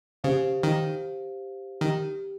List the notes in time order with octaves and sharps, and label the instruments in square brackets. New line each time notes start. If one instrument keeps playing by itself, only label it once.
[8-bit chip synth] C#3 [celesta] G4 C5 F5
[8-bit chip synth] D#3
[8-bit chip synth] D#3 [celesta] G4